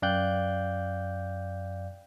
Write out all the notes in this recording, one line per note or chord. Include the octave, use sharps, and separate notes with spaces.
F#2 D5 F5 G5 F#6 G6